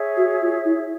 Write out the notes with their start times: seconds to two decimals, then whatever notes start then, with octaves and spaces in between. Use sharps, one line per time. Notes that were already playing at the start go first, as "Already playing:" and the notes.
Already playing: G#4 C#5 E5
0.17 F#4
0.42 F4
0.65 E4